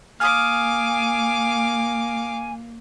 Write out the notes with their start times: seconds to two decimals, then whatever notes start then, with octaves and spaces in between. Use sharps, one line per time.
0.20 A#3 F5 G#5 D6 D#6 F6